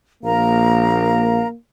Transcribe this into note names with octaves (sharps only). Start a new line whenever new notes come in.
A#1 A#3 A#4 F5 A#5